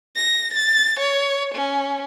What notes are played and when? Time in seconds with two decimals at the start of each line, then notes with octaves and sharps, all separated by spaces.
0.16 A#6
0.53 A6
0.99 C#5
1.55 C#4